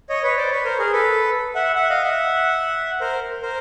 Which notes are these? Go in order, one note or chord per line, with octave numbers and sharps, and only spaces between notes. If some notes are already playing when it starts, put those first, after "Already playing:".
C#5 D#5
B4 C#5
C5 D5
B4 C#5
A#4 C5
G#4 A#4
A4 B4
E5 F#5
E5 F#5
D#5 F5
E5 F#5
A#4 C5
A#4 C5